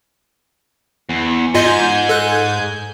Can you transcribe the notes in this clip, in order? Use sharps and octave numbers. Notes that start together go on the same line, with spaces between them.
E2
G#2 F4 D#5 G#5 G6
A4 F#6